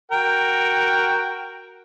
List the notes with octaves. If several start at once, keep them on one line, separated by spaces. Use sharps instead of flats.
F#4 A#4 G5